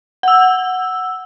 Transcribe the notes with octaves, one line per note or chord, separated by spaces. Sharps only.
F#5 E6